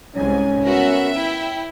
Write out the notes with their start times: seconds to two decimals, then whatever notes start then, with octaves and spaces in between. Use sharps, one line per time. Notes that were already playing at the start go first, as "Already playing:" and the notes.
0.15 C2 G#2 C#4 G#5
0.64 B3 F#4 A#4 E5
1.16 E4 G5